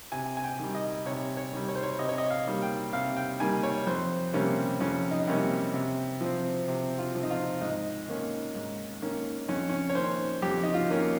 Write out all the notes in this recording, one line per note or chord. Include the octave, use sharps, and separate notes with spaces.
C3 G#5
G#5
G5
D#3 G3
D#5
C3 C#5
C#5
D#3 G3
C#5
C5
C#5
C3 D#5
C#5
D#5
F5
D#3 G3 A#3
G5
C3 F5
G5
D#3 G3 A#3 G#5
C#5
F2 C5
C3 G3 A#3 C#4
F2 C#4
D#4
C3 G3 A#3 C#4
C3
F3 C4
C3
F4
F3 C4
D#4
F4
G#2 D#4
D#3 A#3 C#4
G#2
D#3 A#3 C#4
F2 C#4
C#4
C#5
D#3 A#3 C#4 C5
F2 G4
D#4
F4
D#3 A#3 C#4